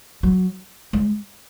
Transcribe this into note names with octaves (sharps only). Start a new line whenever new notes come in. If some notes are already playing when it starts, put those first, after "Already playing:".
F#3
G#3